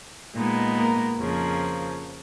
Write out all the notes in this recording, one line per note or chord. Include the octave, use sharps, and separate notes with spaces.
A#2 G#3 B3 D#4
A#3 A#4
F2 C#3 F3 A#3